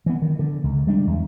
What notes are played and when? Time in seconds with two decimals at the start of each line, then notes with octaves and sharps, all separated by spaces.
0.06 E3 B3
0.22 D#3
0.39 D3
0.64 C#2
0.87 G3 G#3 D4
1.07 E2